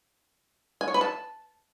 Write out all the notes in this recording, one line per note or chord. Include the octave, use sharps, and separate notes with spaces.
G#5
C#5
B4
A5